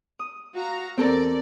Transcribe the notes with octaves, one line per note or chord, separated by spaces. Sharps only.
D#6
F#4 F5 A#5
E2 C4 A4 A#4 D5